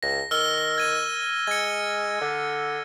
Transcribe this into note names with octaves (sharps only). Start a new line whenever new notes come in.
C#2 A#6
D#3 E6 F6 G7
G#6 D#7
G#3 G#6 C#7
D3